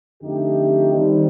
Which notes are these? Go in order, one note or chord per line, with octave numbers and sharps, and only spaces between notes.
F2 D3 A3 D#4 G4
D#3 G3 C4 D#4